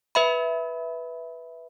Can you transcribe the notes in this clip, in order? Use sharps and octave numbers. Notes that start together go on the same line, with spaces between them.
B4 E5 B5